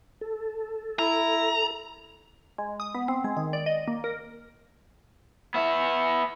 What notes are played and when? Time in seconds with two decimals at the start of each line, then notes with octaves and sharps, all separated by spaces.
0.21 A4
0.99 E4 A#5
2.58 G#3
2.80 D#6
2.95 B3
3.08 C4
3.24 G#3
3.37 D#3
3.53 D5
3.66 D#5
3.88 A#3
4.04 A#4
5.54 B3 E5